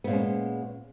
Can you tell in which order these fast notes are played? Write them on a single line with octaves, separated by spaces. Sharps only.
B3 A#2 G#3 C#4